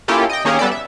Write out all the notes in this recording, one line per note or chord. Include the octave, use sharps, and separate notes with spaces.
A#3 C#4 E4 F4 G4 A4
D#5 G5
D#3 A#3 C#4 G4 G#4 A#4
G3 B3 A4 D5
E5